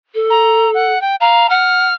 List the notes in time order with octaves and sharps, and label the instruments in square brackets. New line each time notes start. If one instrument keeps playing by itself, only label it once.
[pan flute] A4
[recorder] A#5
F#5
G5
[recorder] F5 [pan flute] A#5
[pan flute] F#5 [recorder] F6